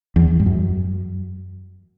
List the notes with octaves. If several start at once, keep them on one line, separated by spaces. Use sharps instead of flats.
E2
G2
F#2